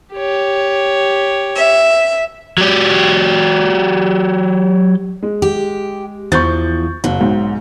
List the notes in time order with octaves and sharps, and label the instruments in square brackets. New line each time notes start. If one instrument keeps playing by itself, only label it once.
[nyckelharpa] G4 C#5
[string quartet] E5
[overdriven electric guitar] F#3 G4
[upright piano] G#3
[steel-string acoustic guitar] G4
[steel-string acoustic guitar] E2 F3 [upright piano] C#6 G6 A6
[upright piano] F#1 [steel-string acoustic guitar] F#3
[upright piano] B1 G#2